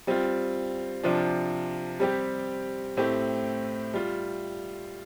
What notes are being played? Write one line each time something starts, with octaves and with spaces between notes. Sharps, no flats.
G3 C4 F4
C3 F3 D4 F4
G3 C4 G4
A2 A3 C4 G4
G3 F4